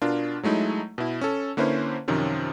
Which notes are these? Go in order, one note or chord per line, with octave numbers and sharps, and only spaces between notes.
B2 D4 F4 A#4
F#3 G#3 A3 D#4 E4
B2 E4
C#4 A4
D3 A#3 C#4 E4 B4 C5
F#2 C3 D#3 F3 C#4